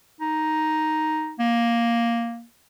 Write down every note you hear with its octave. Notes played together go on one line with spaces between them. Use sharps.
D#4
A#3